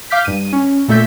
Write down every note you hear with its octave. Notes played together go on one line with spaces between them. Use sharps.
F5 D6 F6 G6 B6
G2 D#7
C#4
A#2 A3 A4 E5 G6 B6